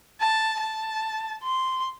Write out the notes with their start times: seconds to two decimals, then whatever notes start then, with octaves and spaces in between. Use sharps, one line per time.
0.21 A5
0.60 A5
1.43 C6